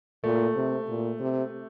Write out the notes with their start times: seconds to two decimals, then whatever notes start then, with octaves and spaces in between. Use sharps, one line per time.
0.24 A#2 A3
0.56 C3
0.89 A#2
1.20 C3